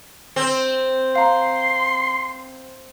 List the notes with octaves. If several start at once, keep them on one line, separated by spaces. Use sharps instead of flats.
C4
F5 A#5 C6